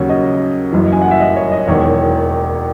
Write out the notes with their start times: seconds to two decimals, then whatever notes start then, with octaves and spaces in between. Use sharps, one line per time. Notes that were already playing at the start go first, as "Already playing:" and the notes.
Already playing: D#2 C#3 F#3 C#5
0.09 D#5
0.72 F#1 F#2 E3
0.92 G#5
1.02 F#5
1.11 E5
1.20 D#5
1.36 C#5
1.52 D#5
1.68 E1 E2 D#3 C#5